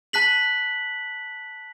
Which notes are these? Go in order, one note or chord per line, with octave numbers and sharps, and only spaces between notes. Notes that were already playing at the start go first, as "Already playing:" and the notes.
A5 F#6 B6 F#7